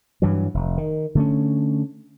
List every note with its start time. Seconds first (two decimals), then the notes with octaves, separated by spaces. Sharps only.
0.22 G2 E3 F#3
0.54 F1
0.78 D#3
1.15 D3 A3 C#4